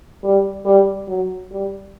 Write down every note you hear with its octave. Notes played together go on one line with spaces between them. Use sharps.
G3
G3
F#3
G3